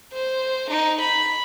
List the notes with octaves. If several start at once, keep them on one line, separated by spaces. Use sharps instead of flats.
C5
D#4
B5